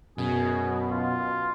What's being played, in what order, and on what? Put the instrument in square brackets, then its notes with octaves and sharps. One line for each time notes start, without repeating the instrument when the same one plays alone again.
[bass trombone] F#2 [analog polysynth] B2 [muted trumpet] G#4
[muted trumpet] F4